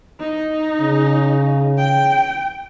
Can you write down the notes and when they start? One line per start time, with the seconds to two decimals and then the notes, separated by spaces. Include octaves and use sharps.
0.20 D#4
0.80 C#3
1.78 G5